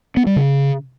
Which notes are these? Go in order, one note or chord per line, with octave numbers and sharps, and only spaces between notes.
B3
G3
C#3